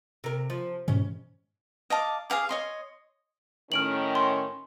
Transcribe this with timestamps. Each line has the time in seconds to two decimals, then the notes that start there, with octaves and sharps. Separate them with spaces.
0.24 C3 A#4
0.50 F3
0.88 G#2 B2 E3 C#4
1.90 D#5 F5 A5 D6
2.30 G#4 D#5 F5 D6
2.49 C#5 D#5 C6
3.72 A2 D#3 C#4 F6 D7 F#7
4.15 C6